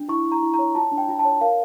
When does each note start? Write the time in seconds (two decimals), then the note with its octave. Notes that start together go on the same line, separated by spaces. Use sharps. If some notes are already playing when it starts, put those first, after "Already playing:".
Already playing: D4
0.09 E4 C#6
0.26 E4
0.32 A#5
0.43 E4
0.54 A#5
0.59 C#5
0.75 F4 A5
0.92 D4
0.98 G5
1.08 F4
1.19 A5
1.25 C#5
1.41 A#4 F5